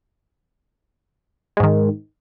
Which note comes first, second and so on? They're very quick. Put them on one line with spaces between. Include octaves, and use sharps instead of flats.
G#3 G#2 D#3